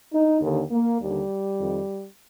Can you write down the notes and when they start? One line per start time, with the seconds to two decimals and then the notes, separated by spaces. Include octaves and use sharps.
0.12 D#4
0.42 D#2 D3
0.71 A#3
1.00 D#2 D3 G3
1.60 F2 D#3